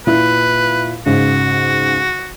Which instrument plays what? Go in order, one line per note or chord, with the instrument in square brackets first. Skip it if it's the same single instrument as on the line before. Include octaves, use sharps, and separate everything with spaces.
[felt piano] A#2 E4 [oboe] B4
[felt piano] G#2 C#3 [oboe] F#4